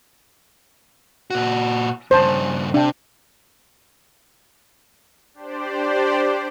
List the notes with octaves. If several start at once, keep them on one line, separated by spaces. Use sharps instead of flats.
A#2 F#4
G2 C#3 C5 A5
C3 D4 G5
D4 G4 C5 D5